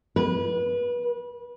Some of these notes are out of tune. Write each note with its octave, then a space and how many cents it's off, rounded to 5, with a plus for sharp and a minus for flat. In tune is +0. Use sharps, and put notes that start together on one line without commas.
B4 -30